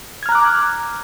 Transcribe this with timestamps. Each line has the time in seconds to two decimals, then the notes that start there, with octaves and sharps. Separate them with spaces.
0.23 G#6
0.26 F6
0.29 A#5
0.32 F#6
0.35 D6